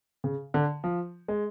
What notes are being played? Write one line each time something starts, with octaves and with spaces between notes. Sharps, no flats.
C#3
D3
F3
G#3